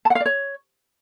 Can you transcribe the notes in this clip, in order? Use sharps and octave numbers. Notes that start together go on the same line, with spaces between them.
A5
F#5
F5
D5
C#5